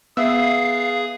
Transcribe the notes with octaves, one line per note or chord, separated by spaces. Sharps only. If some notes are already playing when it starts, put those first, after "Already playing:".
B3 G#4 E5 F5